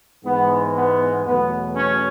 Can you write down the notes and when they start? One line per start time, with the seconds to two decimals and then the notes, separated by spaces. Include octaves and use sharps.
0.24 G#2 E3 G#3 B3
0.75 B3
1.24 E2 B2 F#3 A3 B3
1.76 C#4